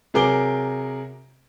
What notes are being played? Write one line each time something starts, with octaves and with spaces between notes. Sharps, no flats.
C3 F#3 G#4 A#4 D6 G7